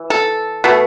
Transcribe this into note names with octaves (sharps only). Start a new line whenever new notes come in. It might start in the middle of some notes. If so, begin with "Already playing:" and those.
Already playing: E3
A4
B2 A3